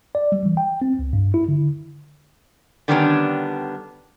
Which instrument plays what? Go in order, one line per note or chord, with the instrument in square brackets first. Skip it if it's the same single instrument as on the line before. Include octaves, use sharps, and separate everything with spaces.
[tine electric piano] D5
G3
E3
G5
C4
C#2
G2
E4
D3
[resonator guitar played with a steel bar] D3 D#3 G3 B3 C#4 D4